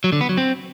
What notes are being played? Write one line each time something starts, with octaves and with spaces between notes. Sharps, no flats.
F#3
D3
B3
F#3
C4